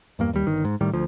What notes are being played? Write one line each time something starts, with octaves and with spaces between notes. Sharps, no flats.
E2 G2 A#3
D#2 G3
G1 D#3
G#2
A2 D#3 G3
D2 F3